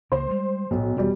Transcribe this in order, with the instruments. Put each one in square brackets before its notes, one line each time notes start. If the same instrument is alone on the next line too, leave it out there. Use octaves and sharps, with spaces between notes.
[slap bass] C#2 C#3 A#3 [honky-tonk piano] C5
[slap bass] G3 G#3
[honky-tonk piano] B1 [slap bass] A2 F3
[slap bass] E1 [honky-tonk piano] B2 G3